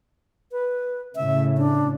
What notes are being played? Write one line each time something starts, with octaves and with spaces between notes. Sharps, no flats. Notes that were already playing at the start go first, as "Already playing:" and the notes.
B4
A2 C#3 E5
D4